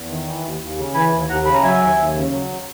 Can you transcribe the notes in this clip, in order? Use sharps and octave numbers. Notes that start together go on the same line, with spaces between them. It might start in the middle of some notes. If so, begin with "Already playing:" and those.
Already playing: E2
D#3
E3
D#2
D#2
C#3
E3 G#5 B5
D#2
D#2 F#5 A#5
C#3 B5
A#5
F#3 E5 G#5
D#2
D#2
C#3
F#3